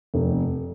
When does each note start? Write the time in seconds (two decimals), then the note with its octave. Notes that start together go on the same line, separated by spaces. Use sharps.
0.14 F1